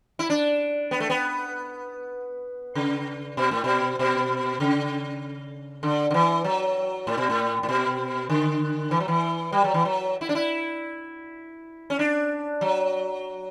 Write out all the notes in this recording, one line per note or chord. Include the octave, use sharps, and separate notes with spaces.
E4
D4
B3
A3
B3
C#3
B2
A2
B2
B2
C#3
D3
D3
E3
F#3
A2
B2
A2
A2
B2
D3
E3
F#3
E3
G3
F#3
E3
F#3
E4
D4
E4
C#4
D4
F#3